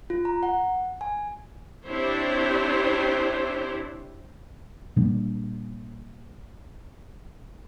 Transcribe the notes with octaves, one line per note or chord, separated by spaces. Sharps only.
F4
A#5
F#5
G#5
C4 D4 E4 G4 C5 C#5
A#2 G3 A#3 D4